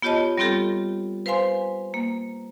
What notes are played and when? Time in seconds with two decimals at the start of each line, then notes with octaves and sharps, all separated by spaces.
0.02 B3 F4 G4 C#5 D#5 A5
0.38 G3 B3 C4 F4 G4 A4
1.26 B4 C5 F5 G#5 C6
1.94 A#3